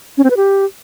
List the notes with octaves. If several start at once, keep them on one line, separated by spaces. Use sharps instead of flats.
C#4
C4
B4
G4